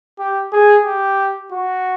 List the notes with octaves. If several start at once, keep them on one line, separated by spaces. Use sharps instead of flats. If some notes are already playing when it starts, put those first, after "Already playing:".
G4
G#4
G4
F#4